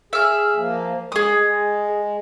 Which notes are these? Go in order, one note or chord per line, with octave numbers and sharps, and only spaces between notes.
G#4 E5 F6
F3 A#3
G#3 G#4 D#6
G#3